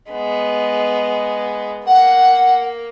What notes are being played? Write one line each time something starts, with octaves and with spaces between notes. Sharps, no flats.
G#3 B3
A#3 F#5